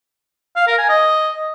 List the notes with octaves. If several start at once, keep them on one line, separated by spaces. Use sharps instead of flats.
F5
A#4
G#5
D#5